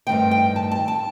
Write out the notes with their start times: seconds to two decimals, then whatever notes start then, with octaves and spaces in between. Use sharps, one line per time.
0.07 G2 D#3 A3 C4 G5
0.31 G5
0.56 A5
0.72 A5
0.88 A5